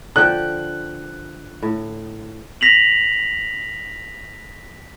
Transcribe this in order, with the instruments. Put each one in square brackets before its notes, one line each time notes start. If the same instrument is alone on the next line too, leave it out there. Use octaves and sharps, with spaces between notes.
[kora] D3 F3 G5 [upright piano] F#6
[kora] A2
[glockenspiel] A#6 B6 F7 F#7